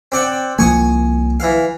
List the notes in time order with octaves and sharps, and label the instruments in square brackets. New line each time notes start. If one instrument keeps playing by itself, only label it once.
[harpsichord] C4 D5 F#5
[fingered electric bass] C2 F3 A#3 [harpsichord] G#5 C#6 D#6
[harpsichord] E3 F5